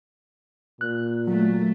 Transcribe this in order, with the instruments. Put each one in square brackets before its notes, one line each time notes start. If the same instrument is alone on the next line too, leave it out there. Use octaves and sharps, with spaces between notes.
[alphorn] A#2 [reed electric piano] F#6
[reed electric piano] F#3 [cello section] A3